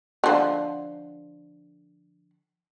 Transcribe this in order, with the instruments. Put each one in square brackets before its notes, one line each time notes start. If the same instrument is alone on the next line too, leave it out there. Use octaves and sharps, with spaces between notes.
[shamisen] D3 F3